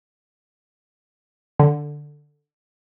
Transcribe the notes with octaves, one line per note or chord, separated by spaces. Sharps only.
D3